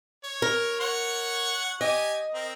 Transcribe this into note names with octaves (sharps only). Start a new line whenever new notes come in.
C#5
A#4
C#5 F#5 C#6
G4 D#5 G#5
C4 A#4